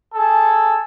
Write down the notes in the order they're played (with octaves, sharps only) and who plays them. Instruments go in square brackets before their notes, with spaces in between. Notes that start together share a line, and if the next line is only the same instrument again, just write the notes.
[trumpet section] G#4 A4